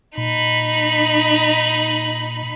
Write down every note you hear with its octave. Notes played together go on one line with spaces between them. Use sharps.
A#2 D#4 B5